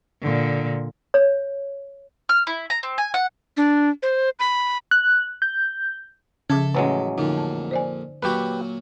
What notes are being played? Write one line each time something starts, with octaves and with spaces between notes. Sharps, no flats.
A#2 D3
C#5
F6
E4
A#5
C4
G#5
F#5
D4
C5
B5
F#6
G6
C#3 F3 A4 E5 D6 G#6
A1 F#3 G#3 C#4 F#4 B4
F2 A#2 D3 D#4
A5
C5 D5 G#5
A#2 F#3 F#4 G4 B4